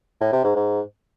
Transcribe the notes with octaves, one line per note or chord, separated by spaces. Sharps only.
A2
C3
G#2
G#2